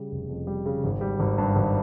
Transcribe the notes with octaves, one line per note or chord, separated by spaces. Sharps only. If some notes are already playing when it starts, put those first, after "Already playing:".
Already playing: C#3 G3
F1
F2
G3
C#3
G#1
G3
G#1
G2
G#1